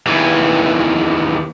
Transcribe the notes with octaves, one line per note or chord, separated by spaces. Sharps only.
D#2 E3